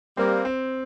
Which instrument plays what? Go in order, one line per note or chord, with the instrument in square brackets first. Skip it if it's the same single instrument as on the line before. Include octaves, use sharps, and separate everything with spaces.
[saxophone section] G3 A#3 [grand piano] C4
[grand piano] C4